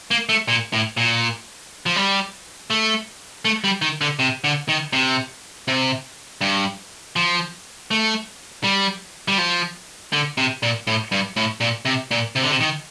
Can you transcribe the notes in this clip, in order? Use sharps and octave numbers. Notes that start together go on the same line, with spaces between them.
A#3
A3
A#2
A2
A#2
F3
G3
A3
A3
G3
D#3
D3
C3
D3
D#3
C3
C3
G2
F3
A3
G3
G3
F3
D3
C3
A#2
A2
G2
A2
A#2
C3
A#2
C3
D3
C3
D#3